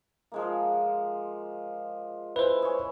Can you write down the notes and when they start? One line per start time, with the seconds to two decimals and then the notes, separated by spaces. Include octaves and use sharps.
0.32 F3 G#3 A#3
2.36 E4 B4 C5 G#5
2.62 G#4 C#5